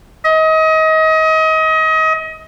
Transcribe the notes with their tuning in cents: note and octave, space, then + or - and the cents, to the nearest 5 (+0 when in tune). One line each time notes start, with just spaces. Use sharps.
D#5 +30